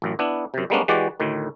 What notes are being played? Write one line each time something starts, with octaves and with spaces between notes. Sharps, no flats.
A1 F#2
B3 D4 E4
F#2 C3
G3 G#3 A#3 B3 C#4 D4
E3 G#3 F#4 G4 D5
D2 A2 D#3